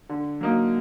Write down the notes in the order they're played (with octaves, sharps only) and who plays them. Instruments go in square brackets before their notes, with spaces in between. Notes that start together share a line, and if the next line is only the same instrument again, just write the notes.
[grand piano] D3
F#3 A#3 D#4